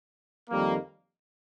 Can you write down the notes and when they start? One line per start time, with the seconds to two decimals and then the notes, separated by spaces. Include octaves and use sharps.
0.50 F2 D#3 G3 A#3